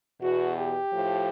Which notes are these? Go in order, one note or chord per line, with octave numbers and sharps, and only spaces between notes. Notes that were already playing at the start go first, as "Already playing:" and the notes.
E2 B2 F#4
G4
A2 F3